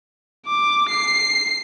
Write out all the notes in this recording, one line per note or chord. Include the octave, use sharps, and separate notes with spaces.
D6
C7